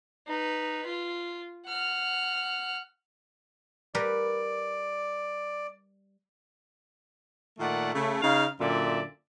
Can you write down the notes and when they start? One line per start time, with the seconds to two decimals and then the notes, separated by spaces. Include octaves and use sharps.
0.27 D#4 B4
0.86 F4
1.67 F#5 F6
3.95 G3 A#4 B4 D5
7.59 A#2 D#3 A3 D5 F#5
7.93 C#3 A3
8.22 C#3 D#4 F5
8.60 F#2 A#2 D3 D5 E5